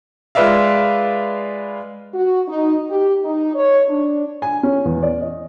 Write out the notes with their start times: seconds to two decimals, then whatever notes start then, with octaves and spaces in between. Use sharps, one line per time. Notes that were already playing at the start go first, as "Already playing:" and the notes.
0.35 G#3 F4 B4 D5 E5 F5
2.14 F#4
2.48 D#4
2.90 G4
3.24 D#4
3.55 C#5
3.89 D4
4.42 G#5
4.63 C#4
4.85 E2
5.03 D5
5.21 D#5